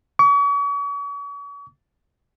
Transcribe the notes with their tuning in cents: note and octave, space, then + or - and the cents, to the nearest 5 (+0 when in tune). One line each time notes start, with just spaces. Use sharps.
C#6 +40